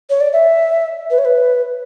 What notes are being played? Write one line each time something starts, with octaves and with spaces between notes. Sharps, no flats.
C#5
D5
E5
B4
C#5
B4